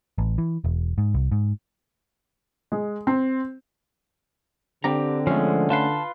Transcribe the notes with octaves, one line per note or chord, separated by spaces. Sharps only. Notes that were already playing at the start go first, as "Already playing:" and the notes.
A1
E3
E1
G#2
C2
G#2
G#3
C4
D3 C4 D4 G4 A#5
F3 G#3 A3 C#4
F4 B4 A5 C6